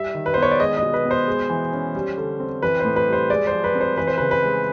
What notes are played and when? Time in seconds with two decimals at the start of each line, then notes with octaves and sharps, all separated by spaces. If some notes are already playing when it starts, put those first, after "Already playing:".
Already playing: G3 E5
0.15 D#3
0.26 B4
0.34 B3 C5
0.42 C#5
0.51 D5
0.60 G#3 D#5
0.77 D#5
0.82 B2
0.94 B4
1.05 B3
1.11 C5
1.27 G#3
1.50 E3
1.73 C#4
1.95 G3
2.17 D3
2.40 C4
2.62 E3 B4
2.79 C5
2.85 A2
2.96 B4
3.08 G3
3.13 C5
3.30 G#3 D5
3.47 F3 C5
3.64 B4
3.75 C4
3.81 C5
3.97 E3 B4
4.07 C5
4.18 C#3 B4
4.31 B4
4.42 G#3